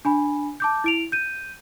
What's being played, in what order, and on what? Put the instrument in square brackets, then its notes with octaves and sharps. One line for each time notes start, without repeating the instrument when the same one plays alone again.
[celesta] D4 G#5 B5
A5 D6 G6
E4 D7 F7
G6 D#7